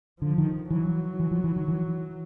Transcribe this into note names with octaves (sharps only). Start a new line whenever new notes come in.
D3 F3
D#3
E3 F#3
E3
F3
E3
D#3
E3